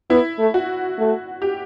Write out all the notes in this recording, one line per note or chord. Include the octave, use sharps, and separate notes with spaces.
B3 E4
A3
F#4
A3
G4